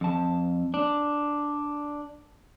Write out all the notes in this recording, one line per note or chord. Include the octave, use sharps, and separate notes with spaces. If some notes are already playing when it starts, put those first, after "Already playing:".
F2 A5
D4